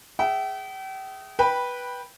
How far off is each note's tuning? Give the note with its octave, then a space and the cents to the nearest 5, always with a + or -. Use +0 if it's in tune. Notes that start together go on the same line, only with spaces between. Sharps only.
G#4 +0 E5 +0 G5 -40
B4 -10 G5 +0 B5 +0